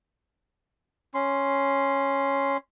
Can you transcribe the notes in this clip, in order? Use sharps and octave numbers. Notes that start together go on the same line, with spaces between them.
C#4 C6